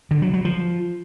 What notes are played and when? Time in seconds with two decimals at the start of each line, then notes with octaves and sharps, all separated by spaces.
0.11 D3
0.22 F#3
0.33 F#3
0.45 F3